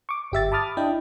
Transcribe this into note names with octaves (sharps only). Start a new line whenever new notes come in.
C#6 D6
G1 G4 E5 A6
A5 B5 D6 D#6 F6 A6
D4 E4 D#5 G5